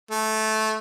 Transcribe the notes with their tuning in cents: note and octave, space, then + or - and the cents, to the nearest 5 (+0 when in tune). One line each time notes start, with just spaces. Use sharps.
A3 -15